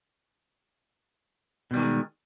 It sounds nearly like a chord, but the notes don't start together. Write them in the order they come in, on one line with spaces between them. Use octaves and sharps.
B2 G3 D#3 A#3 G#3